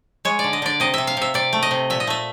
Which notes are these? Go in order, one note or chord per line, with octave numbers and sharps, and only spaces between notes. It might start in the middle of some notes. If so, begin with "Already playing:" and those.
G#3 C#5
D5
D3
D#5
D3 D5
C3 D#5
C3 E5
F5
C3 E5
C3 D5
A3
D#5
C3
A#2 E5
D#5
A3 E5